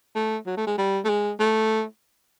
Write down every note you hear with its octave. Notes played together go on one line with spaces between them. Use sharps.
A3
F#3
A3
G#3
G3
A3
G#3
A3